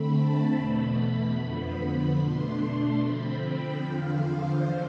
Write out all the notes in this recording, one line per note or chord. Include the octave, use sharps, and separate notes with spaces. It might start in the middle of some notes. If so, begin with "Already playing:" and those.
Already playing: D3 A3 C4 B5
A5
E2 B2 A3 B5
F2 D3 F3 B3
B2 A3 D4 C6
D3 F3 C4 B5
G5
E2 D3 F3 F5
C5